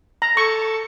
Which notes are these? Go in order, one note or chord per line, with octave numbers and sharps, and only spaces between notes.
A#5
A4 C#6